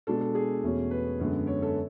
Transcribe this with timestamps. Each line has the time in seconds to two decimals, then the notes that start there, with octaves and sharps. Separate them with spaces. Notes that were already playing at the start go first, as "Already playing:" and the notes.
0.07 B2 G#3 D4 A4
0.21 A4
0.35 G#4
0.64 E2 B2 A3 C#4
0.91 B4
1.20 F#2 D3 G#3 B3
1.47 C#5
1.62 A4